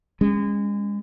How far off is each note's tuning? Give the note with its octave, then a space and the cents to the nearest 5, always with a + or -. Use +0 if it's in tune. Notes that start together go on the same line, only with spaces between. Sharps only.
G#3 -30 C#4 +0